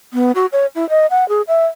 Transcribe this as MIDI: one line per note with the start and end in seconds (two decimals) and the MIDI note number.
0.14 0.32 59
0.35 0.46 66
0.52 0.66 73
0.75 0.88 64
0.89 1.06 75
1.11 1.27 78
1.29 1.42 68
1.48 1.66 76